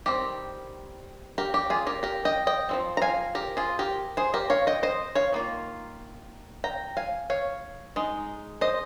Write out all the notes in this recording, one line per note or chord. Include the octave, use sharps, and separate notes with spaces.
D#3 G3 C4 G4 A#4
G4 A#4
G4
F4 G#4
G4 A#4
G4 A#4
D#5 G5
D#5 G5
F3 G#3 C4
A#5
F5 G#5
G4 A#4
F4 G#4
G4 A#4
G#4 C5
G4 A#4
C#5 F5
D#5 G5
C5 D#5
C#5 F5
D#3 A#3 F4
G5 A#5
F5 G#5
C#5 F5
G#3 D#4
C5 D#5